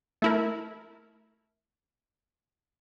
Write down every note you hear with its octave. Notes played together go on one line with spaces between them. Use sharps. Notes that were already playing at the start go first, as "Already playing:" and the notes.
A3 E4 A#4